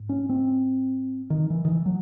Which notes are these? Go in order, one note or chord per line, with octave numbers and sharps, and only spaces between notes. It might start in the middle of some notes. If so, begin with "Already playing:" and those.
Already playing: G#2
C#4
C4
D#3
E3
D#3
E3
F#3